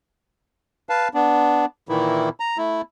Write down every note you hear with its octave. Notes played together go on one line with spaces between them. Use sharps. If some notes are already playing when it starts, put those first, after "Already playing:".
B4 F5 A5
B3 D4
A#2 D#3 E3 E4
A#5
A3 E4